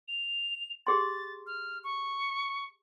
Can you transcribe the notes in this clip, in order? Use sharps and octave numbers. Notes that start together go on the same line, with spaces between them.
F7
G4 G#4 C6 A6
F6
C#6